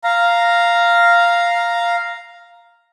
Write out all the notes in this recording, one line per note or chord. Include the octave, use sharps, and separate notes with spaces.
F5 A#5